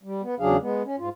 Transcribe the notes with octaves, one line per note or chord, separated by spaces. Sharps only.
G3
B3
E2 C#3 F#3 D4 G#4 F5
G#3 B3
C#4
G#2 F4